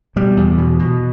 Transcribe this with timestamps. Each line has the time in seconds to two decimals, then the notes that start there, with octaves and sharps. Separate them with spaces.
0.16 B2 G3
0.37 E2
0.58 B2
0.79 B2